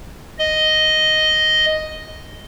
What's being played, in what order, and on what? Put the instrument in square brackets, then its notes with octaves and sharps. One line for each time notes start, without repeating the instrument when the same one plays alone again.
[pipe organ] D#5